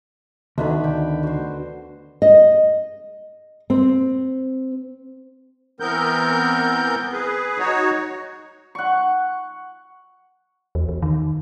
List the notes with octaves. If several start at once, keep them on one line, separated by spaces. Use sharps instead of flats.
D2 B2 D3 D#3 B5
G5
F#4 C5
D#5
C4
E3 B3 C4 A#4 G6
G#4 B4
D#4 F#4 C#5
F#5 C#6
E2
E2
D#3